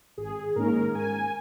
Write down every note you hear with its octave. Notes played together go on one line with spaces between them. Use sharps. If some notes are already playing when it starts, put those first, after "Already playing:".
G#1 G#4
G#2 D#3 A#3 C#4 A#4
G#2 G#5